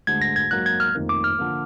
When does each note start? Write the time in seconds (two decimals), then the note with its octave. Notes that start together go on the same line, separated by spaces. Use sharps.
0.07 D2 D3 G#3 G#6
0.22 A#6
0.36 G#6
0.51 G#2 F#3 A#3 F#6
0.66 G#6
0.80 F6
0.95 F1 F2 D#3 A#3
1.09 D6
1.24 F6
1.39 D3 F3 A#3